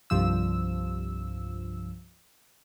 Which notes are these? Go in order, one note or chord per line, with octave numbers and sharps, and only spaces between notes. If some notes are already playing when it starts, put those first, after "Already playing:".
C2 G2 F3 E6